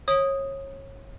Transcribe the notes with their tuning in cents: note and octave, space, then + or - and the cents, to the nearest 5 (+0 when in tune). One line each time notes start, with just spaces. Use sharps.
C#5 -25 D#6 +0